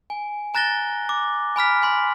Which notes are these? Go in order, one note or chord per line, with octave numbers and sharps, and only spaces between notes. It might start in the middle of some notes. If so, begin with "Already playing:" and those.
G#5
G#5 A#5 F#6 A6 A#6 G7
D6
G#5 B5 F6 B6
G#5 C6 B6